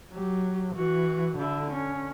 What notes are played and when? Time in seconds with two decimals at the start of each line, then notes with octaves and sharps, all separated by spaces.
0.13 F#3 G4
0.76 E3 F#4
1.38 D3 E4
1.71 C#4